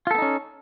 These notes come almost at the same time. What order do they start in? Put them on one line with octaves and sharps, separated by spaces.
F4 A4 B3 D#4 C#4